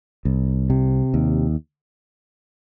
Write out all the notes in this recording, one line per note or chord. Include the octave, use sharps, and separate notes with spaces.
C2
C3
D#2